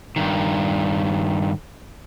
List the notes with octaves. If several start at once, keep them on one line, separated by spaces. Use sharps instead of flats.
G2 D#3